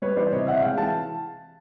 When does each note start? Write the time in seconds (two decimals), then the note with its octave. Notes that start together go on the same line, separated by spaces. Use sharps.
0.02 G3 B4 C#5
0.17 E3 C5 D5
0.33 C3 C#5 D#5
0.47 C3 E5 F#5
0.62 G#3 F5 G5
0.78 E3 A5